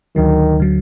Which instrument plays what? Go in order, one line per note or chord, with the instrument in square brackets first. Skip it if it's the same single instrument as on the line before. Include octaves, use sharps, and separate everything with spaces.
[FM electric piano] D2 D3 F#3 [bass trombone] D#3
[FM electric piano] D3 F#3